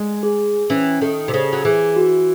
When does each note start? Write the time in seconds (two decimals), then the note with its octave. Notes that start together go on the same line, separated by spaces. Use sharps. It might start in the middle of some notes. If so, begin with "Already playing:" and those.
Already playing: G#3
0.23 G#4
0.70 E3 C#4
1.02 D#3 A4
1.28 C3
1.34 C#3 A4
1.53 F#3
1.65 E3 G#4
1.96 F#4